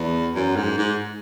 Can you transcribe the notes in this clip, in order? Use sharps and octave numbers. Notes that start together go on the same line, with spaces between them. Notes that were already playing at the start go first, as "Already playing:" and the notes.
Already playing: E2
F#2
G#2
G#2